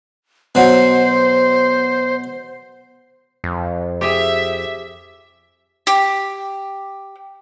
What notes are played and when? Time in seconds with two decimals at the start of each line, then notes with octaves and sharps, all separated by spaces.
0.55 B2 F#3 C5
3.44 F2
4.01 G4 G#4 E5
5.87 G4